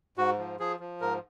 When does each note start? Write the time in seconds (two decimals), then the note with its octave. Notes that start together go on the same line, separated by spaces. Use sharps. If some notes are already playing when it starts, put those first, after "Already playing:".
0.17 G#2 F#4
0.38 F3
0.60 F3 G#4
0.80 F3
1.01 G#2 A#4